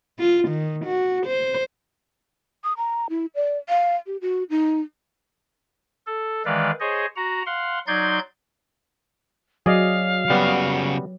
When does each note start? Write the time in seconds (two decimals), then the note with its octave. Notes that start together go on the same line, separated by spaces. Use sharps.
0.19 F4
0.49 D#3
0.85 F#4
1.27 C5
2.64 D#6
2.77 A#5
3.10 E4
3.35 D5
3.69 F5
4.06 G4
4.21 F#4
4.50 D#4
6.07 A4
6.45 D#3 E3 G#3 B4 D5 F5
6.80 G#4 C5 C#5 D#5
7.16 F#4 F#5 A#5
7.46 F5 F#5 C6
7.87 F#3 D#4 D5 C6 G6 G#6
9.66 F#3 G#4 D5 D#5 F5
10.30 C#3 G3 B3 F#4